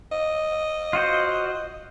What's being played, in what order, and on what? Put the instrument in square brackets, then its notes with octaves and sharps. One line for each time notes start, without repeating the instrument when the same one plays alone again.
[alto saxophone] D#5
[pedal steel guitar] F4 F#4 C5